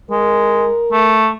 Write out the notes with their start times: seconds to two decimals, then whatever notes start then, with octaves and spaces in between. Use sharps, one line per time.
0.11 G#3 A#4
0.92 A3